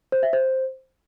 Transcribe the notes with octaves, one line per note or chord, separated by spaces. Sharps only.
C5
E5
C5